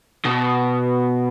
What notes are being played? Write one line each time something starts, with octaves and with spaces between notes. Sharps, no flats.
B2